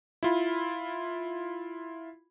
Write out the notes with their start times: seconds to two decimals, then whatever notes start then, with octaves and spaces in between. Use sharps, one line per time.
0.23 E4 F4 B5